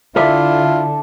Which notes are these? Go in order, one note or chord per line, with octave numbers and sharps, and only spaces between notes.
D3 E4 F4 A4 D5 E5